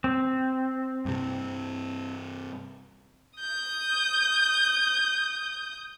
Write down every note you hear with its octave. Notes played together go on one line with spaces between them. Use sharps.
C4
G2 C3
D#6 G6